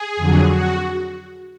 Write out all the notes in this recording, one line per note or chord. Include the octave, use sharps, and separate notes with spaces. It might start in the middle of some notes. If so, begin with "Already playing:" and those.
Already playing: G#4
F2 D3 F#3
F#4